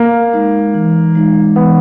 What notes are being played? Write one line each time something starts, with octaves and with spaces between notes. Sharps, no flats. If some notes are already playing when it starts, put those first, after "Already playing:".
Already playing: A#3
G#3 D#4
E3
G#3 D#4
E3 B3